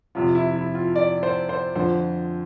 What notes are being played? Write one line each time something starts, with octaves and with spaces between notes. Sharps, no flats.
F2 C3 F3 F4
E4
E4
F4
D5
C5
C5
F2 D3 F3 C5